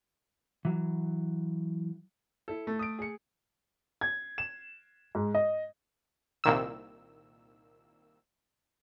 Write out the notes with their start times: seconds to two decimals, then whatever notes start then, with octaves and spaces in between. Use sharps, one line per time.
0.65 E3 F#3
2.48 E4 A4
2.67 A3
2.79 D#6 D7
2.99 G#4 C#7
4.01 G#6
4.38 E7
5.15 G#2
5.35 D#5
6.44 C2 A#2 D#3 E6